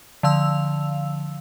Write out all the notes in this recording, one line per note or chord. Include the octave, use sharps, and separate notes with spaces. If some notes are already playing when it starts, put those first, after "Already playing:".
D3 F3 F5 E6 F7